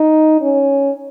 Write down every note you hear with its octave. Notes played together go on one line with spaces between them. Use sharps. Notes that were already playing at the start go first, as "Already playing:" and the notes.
Already playing: D#4
C#4